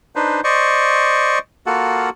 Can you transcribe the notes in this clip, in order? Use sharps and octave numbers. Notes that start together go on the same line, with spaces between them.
D4 D#4 B4 C5
C5 D5 D#5 C#6
A#3 F4 F#4 A4 F#5